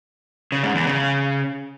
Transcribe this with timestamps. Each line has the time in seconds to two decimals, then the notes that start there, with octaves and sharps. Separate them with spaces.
0.52 C#3
0.63 G#2
0.75 E2
0.86 C#3